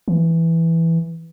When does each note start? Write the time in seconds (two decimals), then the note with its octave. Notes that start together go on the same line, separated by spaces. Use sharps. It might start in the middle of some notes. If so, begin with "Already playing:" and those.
0.08 E3